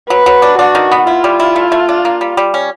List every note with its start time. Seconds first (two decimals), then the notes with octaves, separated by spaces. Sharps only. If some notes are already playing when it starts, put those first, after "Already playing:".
0.10 F#3 B4
0.26 F#3
0.42 D4
0.59 D4 F#4
0.75 D#3
0.92 B3
1.07 E4 F4
1.24 G3
1.40 E4
1.56 A3
1.72 A3
1.89 D4
2.05 A#3
2.21 G3
2.37 G3
2.54 C#4